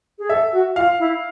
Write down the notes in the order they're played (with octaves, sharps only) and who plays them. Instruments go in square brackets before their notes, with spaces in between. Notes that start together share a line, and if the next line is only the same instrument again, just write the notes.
[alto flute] G#4
[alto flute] A4 [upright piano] E5
[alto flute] F#4
[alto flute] F4 [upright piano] F5
[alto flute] E4